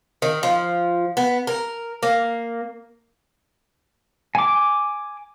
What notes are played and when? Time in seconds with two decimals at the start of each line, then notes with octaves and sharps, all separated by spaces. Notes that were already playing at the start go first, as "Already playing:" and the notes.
0.22 D#3
0.43 F3
1.17 B3
1.47 A#4
2.03 A#3
4.35 G#5 D6